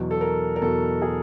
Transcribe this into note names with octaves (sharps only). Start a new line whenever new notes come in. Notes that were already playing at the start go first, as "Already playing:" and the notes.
Already playing: E2 B2 F#3
A4
A#4
A#4
E2 B2 F#3 A4
G#4